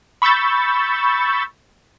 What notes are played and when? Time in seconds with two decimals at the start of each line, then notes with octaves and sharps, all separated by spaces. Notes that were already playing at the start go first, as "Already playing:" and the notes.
0.22 B5 C#6 E6 G6 A6